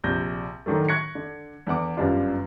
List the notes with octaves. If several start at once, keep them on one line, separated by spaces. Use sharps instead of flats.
A#1 C3 G6 A#6
A2 D3 D#3 F#3 A3
C#6 F#6 G#6 A#6 C#7
D3
E2 D3 F#5 D6
G1 F#2 G3 D4 F4